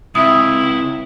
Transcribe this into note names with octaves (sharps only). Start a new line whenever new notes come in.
C#2 C4 E4 D#6